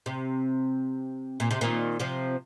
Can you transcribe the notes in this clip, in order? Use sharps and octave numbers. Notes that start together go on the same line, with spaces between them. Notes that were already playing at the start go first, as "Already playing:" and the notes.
C3
A#2
C3
A#2 D#3
C3 F3